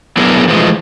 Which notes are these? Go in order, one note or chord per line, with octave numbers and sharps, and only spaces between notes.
F#3 B3 D4 E4 G#4 A#4
E3 F3 G#3 A3